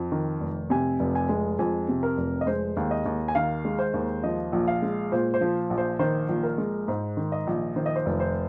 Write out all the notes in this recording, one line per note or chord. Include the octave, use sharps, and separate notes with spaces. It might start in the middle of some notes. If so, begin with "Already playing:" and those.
Already playing: F2
D#3
F1
C3 G#5
F1
G#5
G#3
F2 G#5
C3
A#4
F1
D#5
G#3 C5
D#2
D#5
D#2
G#5
D#3 F5
G#3
C5
D#2
F3 D#5
A#1
F5
G#3
A#2 C5
C5
F3
A#1
C5
D#3 C5
A#1
A#4
G#3
G#2 C5
D#3
D#5
A#1
D#3 C5
D#5
C5
F1
C5